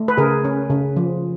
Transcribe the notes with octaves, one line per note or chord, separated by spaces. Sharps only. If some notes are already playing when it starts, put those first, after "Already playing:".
Already playing: A3
B4
C#3 G#4 A#4
C#4
C#3
F3